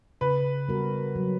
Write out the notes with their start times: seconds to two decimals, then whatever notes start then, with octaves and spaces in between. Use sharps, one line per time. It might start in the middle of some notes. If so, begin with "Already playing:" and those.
0.21 C#3 B4
0.68 G3 B3 F#4 A#4
1.16 F#3